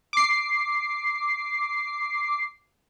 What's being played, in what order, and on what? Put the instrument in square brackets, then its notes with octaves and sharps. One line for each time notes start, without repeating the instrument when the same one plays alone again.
[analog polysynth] D6 C7